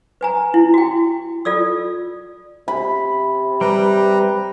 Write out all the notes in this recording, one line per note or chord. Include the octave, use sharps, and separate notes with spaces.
B4 G#5 A#5
E4
F#4 G5
F4 A4 D5 E6
C3 B5
G3 B4 A#5